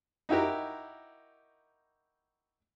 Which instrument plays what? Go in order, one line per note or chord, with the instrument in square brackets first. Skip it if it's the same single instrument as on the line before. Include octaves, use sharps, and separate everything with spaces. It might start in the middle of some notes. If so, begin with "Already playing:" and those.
[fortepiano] D#4 E4 F#4 G4 A#4